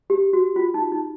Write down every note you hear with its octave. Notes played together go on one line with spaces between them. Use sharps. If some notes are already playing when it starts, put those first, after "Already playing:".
G4
F#4
F4
D#4
D#4